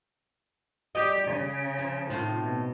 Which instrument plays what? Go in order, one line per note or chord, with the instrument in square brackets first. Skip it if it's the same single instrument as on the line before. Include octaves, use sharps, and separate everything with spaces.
[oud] G3 D#5 [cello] G4
[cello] C#3
[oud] F3
[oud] A2 C3 D#3 [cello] F4
[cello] B2